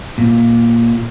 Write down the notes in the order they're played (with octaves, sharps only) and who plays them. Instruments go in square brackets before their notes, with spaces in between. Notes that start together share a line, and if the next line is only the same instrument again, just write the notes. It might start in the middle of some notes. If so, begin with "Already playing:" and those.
[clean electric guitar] A#2